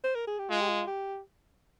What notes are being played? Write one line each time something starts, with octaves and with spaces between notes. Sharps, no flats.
C5
A#4
G#4
G4
G#3 F4
G4
F4
G4